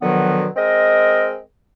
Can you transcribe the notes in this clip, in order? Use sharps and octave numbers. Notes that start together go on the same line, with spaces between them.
B2 D3 D#3 F3 F#3 B3
G#3 C4 A#4 D#5